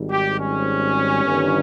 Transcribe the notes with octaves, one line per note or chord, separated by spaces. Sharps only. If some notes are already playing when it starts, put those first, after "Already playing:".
Already playing: G#1 G#2 G3
G4
C#4
G1 G2 D#3